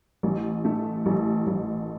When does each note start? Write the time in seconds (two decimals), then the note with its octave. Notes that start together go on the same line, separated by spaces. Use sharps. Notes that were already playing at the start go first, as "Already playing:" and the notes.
0.23 A1
0.65 A3
1.06 A1
1.47 A1